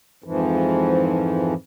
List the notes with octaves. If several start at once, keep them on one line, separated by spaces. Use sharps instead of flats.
F2 G#2 E3 F3